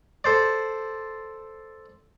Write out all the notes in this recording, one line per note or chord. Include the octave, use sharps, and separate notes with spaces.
A4 C5 D5